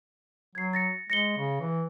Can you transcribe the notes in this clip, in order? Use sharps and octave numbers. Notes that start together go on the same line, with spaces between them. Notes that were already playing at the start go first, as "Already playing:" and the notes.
F#3 G#6 C7
A6 A#6 C#7
G#3 A#6 C#7 G7
C#3
E3